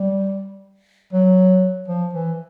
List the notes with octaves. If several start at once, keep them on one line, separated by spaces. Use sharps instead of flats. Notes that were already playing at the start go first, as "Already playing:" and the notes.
Already playing: G3
F#3
F3
E3